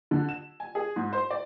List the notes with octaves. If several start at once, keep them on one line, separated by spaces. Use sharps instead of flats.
D3
E7
G#5
G#4
G#2
C5
D5